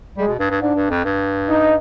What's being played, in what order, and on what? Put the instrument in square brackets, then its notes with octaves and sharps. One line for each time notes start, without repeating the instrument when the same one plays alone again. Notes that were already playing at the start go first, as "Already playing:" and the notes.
[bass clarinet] G3 [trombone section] G#3
[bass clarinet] B2
G2
G2
[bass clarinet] G#2 [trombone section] D4
[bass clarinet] G2
F2
G2
[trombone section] D#4